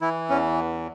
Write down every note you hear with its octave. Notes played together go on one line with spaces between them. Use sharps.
E3 E4
E2 C#4